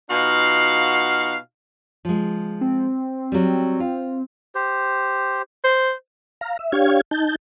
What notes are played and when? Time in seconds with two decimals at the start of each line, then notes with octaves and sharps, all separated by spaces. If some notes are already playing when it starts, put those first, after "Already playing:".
0.10 B2 D#4 F4 F#4 F5
2.05 F3 G#3
2.61 C4
3.32 F#3 G3
3.80 F4
4.55 G4 C5
5.64 C5
6.41 F5 A#5
6.59 E5
6.72 D4 G4 C#5 F5 G#6
7.11 D#4 A5 G6